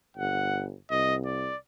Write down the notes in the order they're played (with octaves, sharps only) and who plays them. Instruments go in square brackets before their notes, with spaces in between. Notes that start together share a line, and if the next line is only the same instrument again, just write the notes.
[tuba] G1 [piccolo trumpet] F#5
[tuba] C2 [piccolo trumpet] D#5
[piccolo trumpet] D5